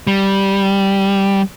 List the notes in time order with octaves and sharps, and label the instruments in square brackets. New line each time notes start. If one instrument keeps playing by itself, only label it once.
[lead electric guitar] G3